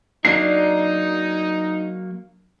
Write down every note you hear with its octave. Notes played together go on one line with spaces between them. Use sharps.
F#3 A#3 D4 D#4 C7